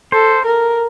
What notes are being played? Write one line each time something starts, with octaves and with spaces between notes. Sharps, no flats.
A4 C5
A#4